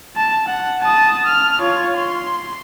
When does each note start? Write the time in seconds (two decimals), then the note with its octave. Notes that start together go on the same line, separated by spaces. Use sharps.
0.16 A5
0.48 F#5
0.82 A5 D#6
1.26 F6
1.60 F4 C#5
1.96 C6